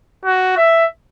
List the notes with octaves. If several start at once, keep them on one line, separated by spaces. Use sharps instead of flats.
F#4
E5